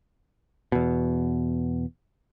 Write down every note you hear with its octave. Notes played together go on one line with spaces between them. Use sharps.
E2 B2